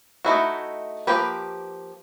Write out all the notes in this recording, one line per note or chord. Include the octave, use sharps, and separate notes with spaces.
A3 D#4 E4 F#4
F3 A#3 G4 B4